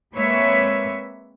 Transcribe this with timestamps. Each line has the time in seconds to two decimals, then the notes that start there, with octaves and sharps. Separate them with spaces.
0.14 G#3 A#3 C4 B4 C#5 E5